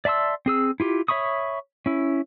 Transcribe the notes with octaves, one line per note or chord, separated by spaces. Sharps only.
D5 E5 A5 C6 E6
C4 G#4 E6
E4 F4 G4
C#5 E5 B5 C#6 D#6
C#4 E4